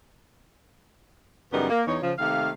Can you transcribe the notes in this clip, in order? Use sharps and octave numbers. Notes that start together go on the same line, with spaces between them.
F#2 C#3 E3 G3 B3 D#4
A#3
E2 D#4 C#5
C#3 F3
C3 D#3 A3 A#3 F5